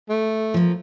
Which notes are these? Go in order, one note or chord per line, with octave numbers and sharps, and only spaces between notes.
A3
F3 A#3